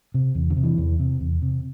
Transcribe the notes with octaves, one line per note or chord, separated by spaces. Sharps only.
C3
E2
D3
C3
E3
E2
C3
E2
C3